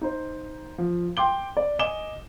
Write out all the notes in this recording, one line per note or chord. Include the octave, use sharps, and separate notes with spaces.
D#4 C5
F3
G5 C6 D6 G7
D5
D#5 G#5 D6 E7 G7